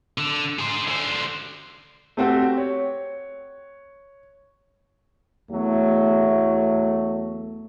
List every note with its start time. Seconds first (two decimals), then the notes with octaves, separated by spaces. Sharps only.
0.18 D3
0.59 G#4 C5
0.88 D3 C5
2.17 A3 C4 F#4 G4
2.57 C#5
5.52 E2 F#3 A3